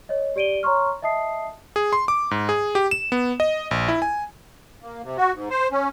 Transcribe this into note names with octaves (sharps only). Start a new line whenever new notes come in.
C#5 D#5
G4 D5 D7 D#7 G7
C#5 A#5 C6 C#6 F6
D#5 E5 A5 D#6 C7
G#4
C6
D6
G#2
G#4
G4
E7
B3
D#5
A#1
E4
G#5
A#3
C3
F#4
G#2
C5
C#4